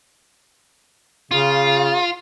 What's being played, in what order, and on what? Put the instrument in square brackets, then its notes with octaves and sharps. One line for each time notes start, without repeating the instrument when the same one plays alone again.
[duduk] C#3 [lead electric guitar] F4